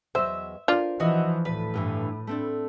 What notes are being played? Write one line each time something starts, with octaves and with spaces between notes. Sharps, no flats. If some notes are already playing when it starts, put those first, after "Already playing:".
E2 F#3 C5 D#5 E5
D4 F4 A#4 C5
E3 F3 F#4 D#5 E5
D2 A2 B4
G2 D3 E3
A3 C4 D4